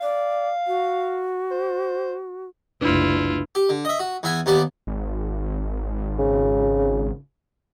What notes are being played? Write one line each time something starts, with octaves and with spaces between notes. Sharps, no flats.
D5 F5
F#4
C5
F#1 C2 A3 D4 E4 F4 B4
G4
D3
D#5 E5
F#4
E2 B3 E5 G#5
D#2 B3 G4 D5 D6
G#1
C#3